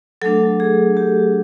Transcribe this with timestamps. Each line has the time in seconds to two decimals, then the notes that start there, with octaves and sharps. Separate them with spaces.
0.22 F#3 A3 D4 A4
0.60 G#4
0.97 G4